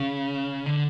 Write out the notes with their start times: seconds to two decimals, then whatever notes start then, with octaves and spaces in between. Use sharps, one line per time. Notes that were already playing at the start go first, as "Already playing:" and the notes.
Already playing: C#3
0.66 D3